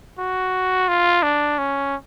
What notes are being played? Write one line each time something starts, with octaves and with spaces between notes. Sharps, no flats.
F#4
F4
D4
C#4